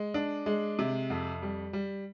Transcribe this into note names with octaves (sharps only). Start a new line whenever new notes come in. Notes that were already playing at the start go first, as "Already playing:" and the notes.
Already playing: G#3
D4
G#3
C3
F2
G3
G3